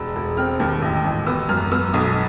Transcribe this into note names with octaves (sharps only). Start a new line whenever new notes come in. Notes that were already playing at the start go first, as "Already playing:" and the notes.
Already playing: E1 E6
E1
C4 F6
D#2
A1
A1
B3 E6
F#2 F6
B3 E6
B1 D#6